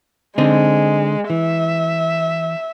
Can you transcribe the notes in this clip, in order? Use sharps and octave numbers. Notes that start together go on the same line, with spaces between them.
D3 G#3 C4 D#4
E3 E5